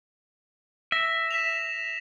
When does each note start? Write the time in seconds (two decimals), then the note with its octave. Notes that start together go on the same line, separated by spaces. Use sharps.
0.92 E5 A#6
1.31 B6 E7 F7